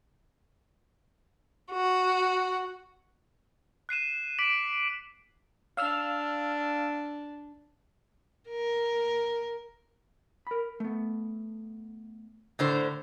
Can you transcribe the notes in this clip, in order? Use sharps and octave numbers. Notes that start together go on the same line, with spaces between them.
F#4
F#6 C7 D#7 E7
D6 B6 D7 D#7 F#7
D4 F5 E6 F6
A#4
A#4 B5
A3 B3
A2 D3 C5